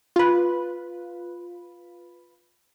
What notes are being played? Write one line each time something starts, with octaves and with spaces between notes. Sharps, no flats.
F4 B4